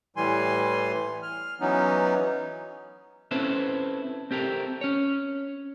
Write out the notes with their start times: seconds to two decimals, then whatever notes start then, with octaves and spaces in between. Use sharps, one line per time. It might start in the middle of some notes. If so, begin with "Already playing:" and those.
0.17 A2 E3 G3 G#5 C6
1.23 F6
1.61 E3 F#3 B3 C#4 D#4
3.31 C4 C#4 E4 A4 B4 C5
4.31 C4 G4 A4 A#4
4.81 C#4 C#5